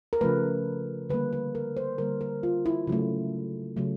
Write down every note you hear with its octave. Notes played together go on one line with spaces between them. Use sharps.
A#4
C#3 F3 A3 B4
D3 G3 A#3 B4
B4
A#4
C5
D3 G3 A#3 A#4
A#4
F4
E4
C#3 F#3 A3
C#3 F#3 A3